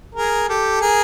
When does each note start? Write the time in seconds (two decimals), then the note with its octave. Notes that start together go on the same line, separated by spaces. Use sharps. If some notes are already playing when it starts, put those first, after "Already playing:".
0.15 G#4 A#4
0.49 G4 A4
0.82 G#4 A#4